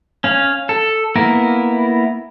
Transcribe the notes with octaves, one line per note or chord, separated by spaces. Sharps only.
C#4 F5
A4
A#3 B3 E4 A#4